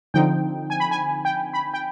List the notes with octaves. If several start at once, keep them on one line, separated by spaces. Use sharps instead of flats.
D3 F3 C4 D#4 G5
G#5
B5
G#5
G5
B5
G5